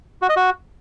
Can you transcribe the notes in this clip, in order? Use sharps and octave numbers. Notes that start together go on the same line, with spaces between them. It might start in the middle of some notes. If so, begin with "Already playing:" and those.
F#4
D#5
F#4